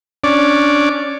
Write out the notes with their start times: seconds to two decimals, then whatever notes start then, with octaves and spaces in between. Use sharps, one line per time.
0.24 C#4 D4 D5